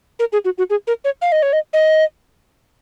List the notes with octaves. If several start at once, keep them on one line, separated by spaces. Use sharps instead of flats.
A#4
G#4
F#4
F#4
G#4
A#4
C#5
F5
D#5
C#5
D#5
D#5